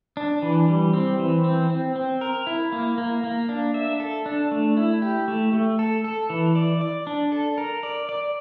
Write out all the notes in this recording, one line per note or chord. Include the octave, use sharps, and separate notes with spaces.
D4
E3
G3
C4
E3
C4
C4
C4
A#4
E4
A#3
A#3
A#3
D4
E5
A4
D4
A3
E4
G4
A3
A3
A4
A4
E3
D5
D5
D4
A4
A#4
D5
D5